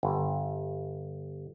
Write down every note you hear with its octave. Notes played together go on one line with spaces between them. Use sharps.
G1